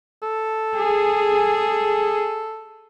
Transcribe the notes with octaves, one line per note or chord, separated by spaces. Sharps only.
A4
G#4